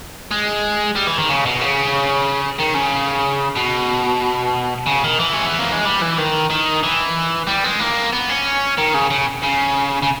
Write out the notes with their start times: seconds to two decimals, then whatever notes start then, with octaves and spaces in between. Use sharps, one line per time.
0.31 G#3
0.95 G3
1.07 E3
1.18 D#3
1.29 C#3
1.46 B2
1.61 C#3
2.59 D#3
2.75 C#3
3.56 B2
4.87 C#3
5.04 D#3
5.20 E3
5.33 C#4
5.46 B3
5.59 A#3
5.72 G#3
5.85 G3
6.02 E3
6.18 D#3
6.50 D#3
6.83 E3
7.47 G3
7.64 G#3
7.80 A#3
8.13 B3
8.30 C#4
8.78 D#3
8.94 C#3
9.11 C#3
9.43 C#3
10.03 C#3